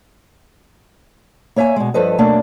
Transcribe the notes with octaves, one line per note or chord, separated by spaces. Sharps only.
A#3 C#5 E5 F5 G#5
B2 G#3
G2 F3 A4 B4 D#5
F#2 B2 A3 A#3 D4